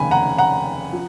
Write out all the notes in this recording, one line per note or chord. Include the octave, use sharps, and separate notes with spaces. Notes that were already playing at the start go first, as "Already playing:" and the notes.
Already playing: F1 D#2 C#3 G#5 B5
F#5 A#5
F#5 A#5
F3